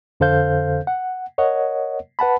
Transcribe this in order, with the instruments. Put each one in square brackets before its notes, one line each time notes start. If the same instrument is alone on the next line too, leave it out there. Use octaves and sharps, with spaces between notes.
[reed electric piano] F2 D3 A4 C5 F5 G6
F#5
A#4 C#5 D#5 F#5
B4 F#5 A5 B5